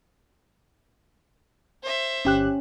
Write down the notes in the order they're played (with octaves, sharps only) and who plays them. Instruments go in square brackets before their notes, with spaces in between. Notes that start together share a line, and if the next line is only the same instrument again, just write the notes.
[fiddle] C5 E5
[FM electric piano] G1 G4 F#6 [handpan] C#4